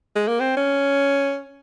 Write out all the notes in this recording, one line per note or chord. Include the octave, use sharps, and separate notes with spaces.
G#3
A#3
C4
C#4